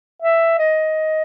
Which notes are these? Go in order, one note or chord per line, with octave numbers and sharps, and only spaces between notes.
E5
D#5